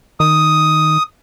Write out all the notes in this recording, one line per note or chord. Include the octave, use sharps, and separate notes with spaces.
D#3 D#6